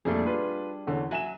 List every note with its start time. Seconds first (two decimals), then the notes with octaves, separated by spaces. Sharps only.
0.05 F2 A#2 G3 A3 D4 G#4
0.25 F4 B4
0.87 E2 D3 C#4
1.11 F#3 E5 G#5 E7